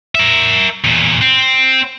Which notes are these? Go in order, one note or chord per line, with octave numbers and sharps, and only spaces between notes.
A#4 E5
E2 A#2
C4